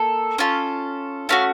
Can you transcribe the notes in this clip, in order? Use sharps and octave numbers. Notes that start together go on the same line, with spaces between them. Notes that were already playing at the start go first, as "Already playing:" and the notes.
Already playing: A#3 A4
C#4 F4 A4
A3 C#4 F#4 F5